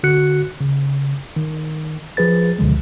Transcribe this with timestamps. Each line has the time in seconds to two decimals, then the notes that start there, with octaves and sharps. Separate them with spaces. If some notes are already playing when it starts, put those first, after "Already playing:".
0.03 D3 F#4 F#6 C#7
0.61 C#3
1.36 D#3
2.17 F3 G#4 B4 A6
2.59 C#2 B2 D3 F3 G#3